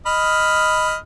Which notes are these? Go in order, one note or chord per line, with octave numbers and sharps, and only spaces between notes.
D#5 B5 F6